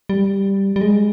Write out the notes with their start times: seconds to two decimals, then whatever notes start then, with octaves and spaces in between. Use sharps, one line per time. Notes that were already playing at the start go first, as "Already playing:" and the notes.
0.09 G3
0.76 G3
0.81 G#3